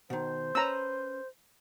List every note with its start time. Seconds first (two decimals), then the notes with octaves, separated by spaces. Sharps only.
0.10 B2 D#3 C5
0.55 C#4 B4 A#5 E6